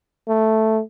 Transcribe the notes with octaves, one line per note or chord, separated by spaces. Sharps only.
A3